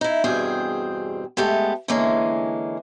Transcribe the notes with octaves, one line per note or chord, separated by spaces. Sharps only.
D#4 E4
E2 G2 B2 C4 G#4 G5
G#3 A3 B3 G4 A4
D3 E3 G#3 A#3 C#4